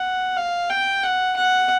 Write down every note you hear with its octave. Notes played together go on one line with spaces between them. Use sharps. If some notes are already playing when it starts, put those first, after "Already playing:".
Already playing: F#5
F5
G5
F#5
F#5